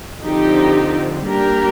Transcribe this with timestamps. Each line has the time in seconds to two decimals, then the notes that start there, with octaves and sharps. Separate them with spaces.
0.24 D3 F3 C4 D#4 G4
1.26 G3 A#3 D4 G4 A#4